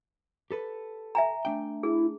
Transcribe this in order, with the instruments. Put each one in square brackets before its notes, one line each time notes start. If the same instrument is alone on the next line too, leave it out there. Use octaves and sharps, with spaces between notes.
[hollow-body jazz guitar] G4 A4 B4
[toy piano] E5 G#5 A#5
[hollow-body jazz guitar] A3 D4 G5
[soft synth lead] E4 [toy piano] G#4